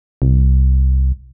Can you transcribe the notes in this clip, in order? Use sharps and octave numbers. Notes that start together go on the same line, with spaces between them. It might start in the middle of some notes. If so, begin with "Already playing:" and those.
C2